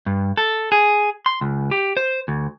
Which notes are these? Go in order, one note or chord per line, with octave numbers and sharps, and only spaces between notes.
G2
A4
G#4
C6
C#2
G4
C5
D2